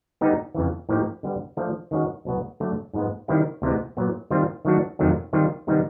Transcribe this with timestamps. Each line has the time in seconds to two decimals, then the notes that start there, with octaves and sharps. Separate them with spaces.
0.21 D3 G3 B3 D#4 G4
0.55 F2 C#3 E3
0.89 A2 F3 A#3 D#4 G4
1.23 D3 G3 B3
1.57 D3 F3 A3 D4
1.91 D#3 G#3 C#4 F#4
2.25 C2 B2 F#3 B3
2.60 D3 F#3 A3
2.93 G#2 F3 G#3 B3
3.28 D#3 G3 C4 E4 G4
3.62 D2 C3 E3 G#3 B3
3.97 A#2 F#3 B3
4.30 D#3 G3 C4 F4
4.65 D#3 F#3 A3 D4 F#4
4.99 F2 C3 D#3 F#3 A3
5.33 D#3 G3 C4 F4
5.67 C3 D#3 G3 B3 D#4